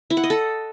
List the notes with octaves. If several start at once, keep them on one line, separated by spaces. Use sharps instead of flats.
E4
F#5
D#5
A4